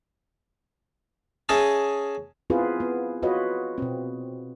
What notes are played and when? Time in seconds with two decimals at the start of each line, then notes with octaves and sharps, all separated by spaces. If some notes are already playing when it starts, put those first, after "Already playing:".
1.49 C#4 G#4 D#5 E5 A5
2.50 B3 C4 E4 F4 G#4 B4
2.80 B3
3.23 F4 F#4 B4 C#5 D#5
3.78 B2 C4